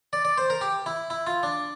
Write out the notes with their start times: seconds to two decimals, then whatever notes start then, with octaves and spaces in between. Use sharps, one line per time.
0.13 D5
0.25 D5
0.38 C5
0.50 A#4
0.61 G4
0.86 E4
1.10 E4
1.27 F4
1.43 D4